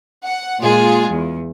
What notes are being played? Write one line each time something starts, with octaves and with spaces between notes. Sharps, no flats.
F#5
A#2 G#3 F4 G#4
E2